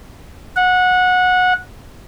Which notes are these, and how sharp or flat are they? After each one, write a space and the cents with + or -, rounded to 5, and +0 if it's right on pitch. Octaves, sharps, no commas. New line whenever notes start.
F#5 -20